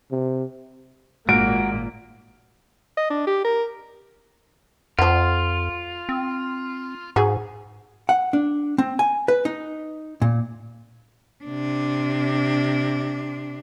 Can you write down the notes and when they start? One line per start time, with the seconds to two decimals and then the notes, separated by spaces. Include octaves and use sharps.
0.11 C3
1.29 G#1 A#2 G#3 A#3 F#4 A#4 D7
2.97 D#5
3.10 D4
3.27 G4
3.45 A#4
4.99 F2 F3 F4 F#5
6.09 C4
7.16 G#2 F#4 G#4
8.09 F#5
8.33 D4
8.78 C4
8.99 G#5
9.28 B4
9.45 D#4
10.22 A#2
11.44 C3 D4